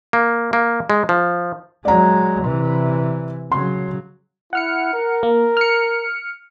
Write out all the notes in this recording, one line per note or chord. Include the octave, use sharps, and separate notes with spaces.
A#3
A#3
G#3
F3
F#3 G#3 D5 A#5
C3 E3
C#3 F#3 C6
E4 F#5 F6 C#7
A#4
A#3
F6 C#7